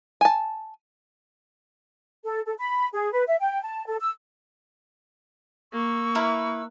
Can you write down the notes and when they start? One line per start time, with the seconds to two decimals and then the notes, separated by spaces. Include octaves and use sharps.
0.21 G#5 A5
2.25 A4
2.46 A4
2.58 B5
2.93 G#4
3.13 B4
3.28 E5
3.40 G5
3.63 A5
3.86 A4
4.00 E6
5.72 A#3 C#6 E6
6.15 E4 A#4 B4